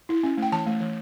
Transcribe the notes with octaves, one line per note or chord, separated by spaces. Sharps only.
E4
C#4
A3 G5
E3 A5
A3
E3